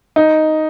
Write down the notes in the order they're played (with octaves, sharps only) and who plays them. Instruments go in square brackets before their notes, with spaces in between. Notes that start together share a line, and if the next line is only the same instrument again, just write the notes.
[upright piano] D#4